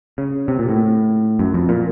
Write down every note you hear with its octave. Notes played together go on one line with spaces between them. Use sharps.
C#3
C3
A#2
A2
F#2
F2
A#2